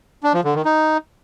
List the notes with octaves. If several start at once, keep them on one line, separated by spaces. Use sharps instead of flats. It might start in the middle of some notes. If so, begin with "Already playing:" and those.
D4
F3
D3
D#3
D#4